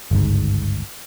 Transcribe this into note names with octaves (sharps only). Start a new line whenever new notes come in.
G1 C#2 G#2